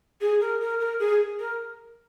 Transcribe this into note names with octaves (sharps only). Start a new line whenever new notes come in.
G#4
A#4
A#4
A#4
G#4
A#4